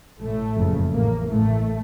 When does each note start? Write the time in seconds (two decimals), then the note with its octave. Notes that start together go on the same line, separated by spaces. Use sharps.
0.22 A1 A2 A3
0.57 F#1 F2 C#3
0.94 A1 A2 A#3
1.30 A1 A2 A3